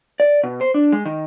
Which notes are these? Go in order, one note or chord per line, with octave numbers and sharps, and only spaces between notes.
D5
B2
C5
D4
G#3
D#3